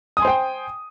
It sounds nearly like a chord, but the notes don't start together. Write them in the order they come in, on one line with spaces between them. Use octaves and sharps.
D#6 G#5 C6 C5 G5